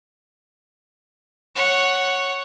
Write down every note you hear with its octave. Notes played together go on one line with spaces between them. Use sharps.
C#5 F#5